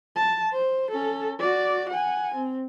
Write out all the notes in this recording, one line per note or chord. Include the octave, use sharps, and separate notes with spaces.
A5
C5
C#4 A4
F#4 D5
F#5 G#5
C4